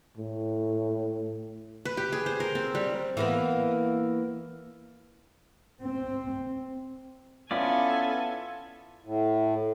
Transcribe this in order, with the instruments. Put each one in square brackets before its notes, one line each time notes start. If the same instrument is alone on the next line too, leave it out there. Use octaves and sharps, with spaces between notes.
[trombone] A2
[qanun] B4
G4
G#4
C5
A#4
C4
G3
[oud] E3 A#3 B3
[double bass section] C4
[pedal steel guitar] B3 C#4 D5 [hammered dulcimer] E4 F4 [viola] A4 G#5
[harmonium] A2